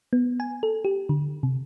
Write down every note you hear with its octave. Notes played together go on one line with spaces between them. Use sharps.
B3
G#5
A4
G4
D3
C3